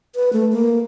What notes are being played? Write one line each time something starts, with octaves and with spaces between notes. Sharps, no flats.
B4
A3
A#3